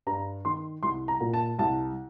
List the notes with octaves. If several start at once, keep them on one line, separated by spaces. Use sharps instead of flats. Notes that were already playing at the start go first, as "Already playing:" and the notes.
G2 A#5
D#3 C6
C2 C6
A#5
A#2
A5
C2 A5